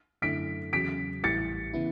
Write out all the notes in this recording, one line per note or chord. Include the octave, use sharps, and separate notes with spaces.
F#2 D3 A3 E4 B6 D7
E2 C#3 F#3 B6 D7
A1 A2 E3 G3 A6 C#7
C#3 E3 B3 E4